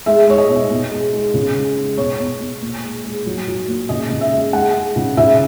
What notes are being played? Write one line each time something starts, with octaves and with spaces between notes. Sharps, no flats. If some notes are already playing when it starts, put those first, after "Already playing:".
G#3 E5
G#3 C#5
D#5
B2
B2
G#3
G#3
C#3
G#3
G#3
B2 C#5
B2
B2
A#2
G#3
G#3
F#3
F#3
A#2
C#3 D#5
C#3
E5
G#3
G#3 F#5
G#3
C#3
C#3 E5